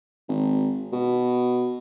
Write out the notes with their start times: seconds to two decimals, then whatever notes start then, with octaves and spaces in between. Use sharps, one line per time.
0.28 G#1
0.93 B2